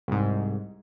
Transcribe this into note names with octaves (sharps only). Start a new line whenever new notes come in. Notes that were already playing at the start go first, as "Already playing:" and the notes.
C2 G#2